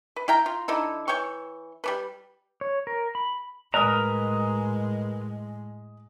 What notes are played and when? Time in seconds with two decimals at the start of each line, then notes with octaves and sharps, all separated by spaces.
0.16 B4
0.28 E4 F5 G5 A#5
0.46 F4
0.68 D3 D#4 E4
1.08 E3 C#5 G5 C#6
1.84 G3 D4 B4
2.61 C#5
2.87 A#4
3.15 B5
3.74 A2 G#3 A#4 B4 D#5 G#5 A#5 D#6